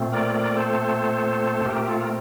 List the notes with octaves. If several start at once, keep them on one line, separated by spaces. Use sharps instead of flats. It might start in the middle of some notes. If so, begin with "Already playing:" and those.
Already playing: A#2 A3 C4
A#4 D5
A#4 D5
A4 C5
A#2 A3 C4 G4 A#4
F4 A4
A#4